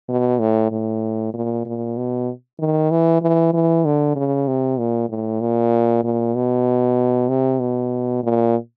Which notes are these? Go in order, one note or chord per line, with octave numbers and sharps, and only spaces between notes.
B2
A2
A2
A#2
A#2
B2
D#3
E3
E3
E3
D3
C#3
C3
A#2
A2
A#2
A#2
B2
C3
B2
A#2